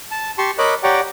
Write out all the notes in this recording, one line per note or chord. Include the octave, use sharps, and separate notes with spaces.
A5
G4 A5 C6 C#6
A#4 C#5 D#5 B5 D6 F#6
G4 C#5 D5 F#5 G5 A#5